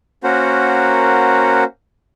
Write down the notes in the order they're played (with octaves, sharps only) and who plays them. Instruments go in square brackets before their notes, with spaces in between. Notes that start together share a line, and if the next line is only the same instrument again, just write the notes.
[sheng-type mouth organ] A#3 C#4 F#4 A#4 C5 F#5